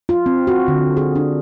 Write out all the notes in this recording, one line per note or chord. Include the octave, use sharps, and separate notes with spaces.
F4
C4
F#4
D3
G#4
D4